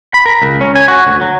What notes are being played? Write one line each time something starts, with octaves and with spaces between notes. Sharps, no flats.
B5
A#4
C#2
C#4
G#5
F#4
D2
F#3